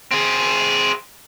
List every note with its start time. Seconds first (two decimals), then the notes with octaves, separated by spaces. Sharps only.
0.11 C4 G#4